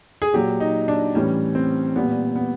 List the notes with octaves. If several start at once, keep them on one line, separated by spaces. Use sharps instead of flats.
G#4
A#2 F#3 G4
D#4
D4
A2 E3 G3 C#4
C4
A#2 G3 B3
B3